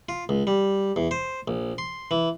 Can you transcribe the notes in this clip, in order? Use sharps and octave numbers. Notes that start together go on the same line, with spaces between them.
F4
C#2
G3
E2
C5
A#1
C6
E3